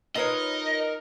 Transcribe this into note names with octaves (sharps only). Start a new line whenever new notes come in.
D#4 F4 A#4 B4 C#5 D#5 A#5